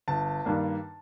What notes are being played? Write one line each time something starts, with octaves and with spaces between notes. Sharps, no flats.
G1 A5
G2 D#3 A#3 D4